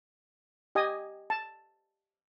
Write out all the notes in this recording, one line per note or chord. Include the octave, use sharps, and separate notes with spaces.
G4 D#5 G#5 D#6
A5